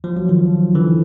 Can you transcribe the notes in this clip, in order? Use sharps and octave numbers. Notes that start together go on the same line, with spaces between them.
F3
F#3
D#3 F3
D3 E3